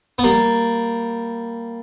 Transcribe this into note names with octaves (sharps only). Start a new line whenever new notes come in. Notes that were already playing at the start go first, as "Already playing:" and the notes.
B3
G3 A#3